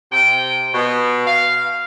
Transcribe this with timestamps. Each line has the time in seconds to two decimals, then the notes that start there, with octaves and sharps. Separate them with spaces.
0.12 C3 G5
0.74 B2
1.27 F5